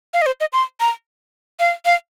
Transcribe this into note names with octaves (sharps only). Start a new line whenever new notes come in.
F5
D#5
C5
D#5
C6
A#5
F5
F5